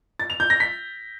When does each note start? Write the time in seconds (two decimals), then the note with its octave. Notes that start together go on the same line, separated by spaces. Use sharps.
0.19 A6
0.30 F7
0.40 G6
0.50 A#6
0.60 B6